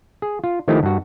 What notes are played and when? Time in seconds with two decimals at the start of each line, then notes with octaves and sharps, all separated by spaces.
0.22 G#4
0.44 F4
0.68 D#3 F3 A3 D#4 E4 G4
0.83 G2 F#4